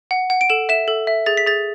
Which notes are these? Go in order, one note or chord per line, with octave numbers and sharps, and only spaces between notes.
F#5
F#5
D7
A4 E7
E5 E7
A4
E5
G#4 A6
B6
G#4 A6